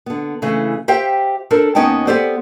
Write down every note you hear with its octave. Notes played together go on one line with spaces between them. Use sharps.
D3 B3
C#3 E3 A3
G4 C5 E5 F5 G5
D4 A4 A#4 C5
D#2 B3 C#4 D#4 G5 A5
B3 C4 G4 A4 C5 D5